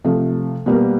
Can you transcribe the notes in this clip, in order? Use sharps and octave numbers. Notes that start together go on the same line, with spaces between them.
C3 F3 A3
B2 G3 A#3